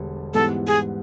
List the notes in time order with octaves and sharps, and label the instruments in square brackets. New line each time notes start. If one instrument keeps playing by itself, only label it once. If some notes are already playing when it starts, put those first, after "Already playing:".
Already playing: [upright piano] E1 D3 G3
[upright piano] G#2 E3 G3 B3 [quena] A4
[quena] G#4